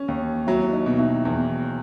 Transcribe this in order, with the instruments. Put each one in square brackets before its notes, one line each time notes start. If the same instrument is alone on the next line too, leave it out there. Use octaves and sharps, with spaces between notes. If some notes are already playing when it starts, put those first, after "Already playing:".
Already playing: [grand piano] C#4
D#2
[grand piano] F#3 [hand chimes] E4 E5
[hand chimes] D#4 D#5
[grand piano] B2
[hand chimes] E4 E5
[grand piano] E2